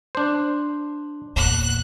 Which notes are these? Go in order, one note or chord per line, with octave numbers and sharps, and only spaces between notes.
D4 C5
E2 A#2 F#6